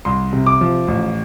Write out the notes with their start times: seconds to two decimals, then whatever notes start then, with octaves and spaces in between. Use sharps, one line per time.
0.05 C2 C6
0.33 C3
0.46 D6
0.61 F3
0.88 A1